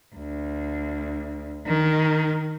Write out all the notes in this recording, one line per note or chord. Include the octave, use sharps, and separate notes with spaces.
D2
D#3